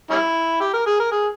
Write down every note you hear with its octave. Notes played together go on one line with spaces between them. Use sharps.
G3 C#4 E4
G4
A#4
G#4
A#4
G#4